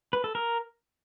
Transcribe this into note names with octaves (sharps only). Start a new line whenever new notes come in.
B4
A4
A#4